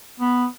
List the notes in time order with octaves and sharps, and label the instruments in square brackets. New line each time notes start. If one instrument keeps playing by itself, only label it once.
[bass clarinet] B3